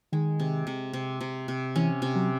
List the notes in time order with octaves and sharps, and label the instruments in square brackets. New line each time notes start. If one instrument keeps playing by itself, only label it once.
[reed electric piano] D#3 [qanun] G#3
[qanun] C3
C3
C3
C3
C3
[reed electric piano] E3 [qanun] C#4
[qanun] C3
[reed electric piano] F#3